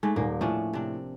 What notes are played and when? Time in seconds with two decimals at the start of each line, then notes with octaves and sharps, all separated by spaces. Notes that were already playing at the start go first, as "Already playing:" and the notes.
0.03 G#2 G#3 A3
0.16 D#1 A#3
0.41 A2 F3 C#4 D4
0.73 C3 D4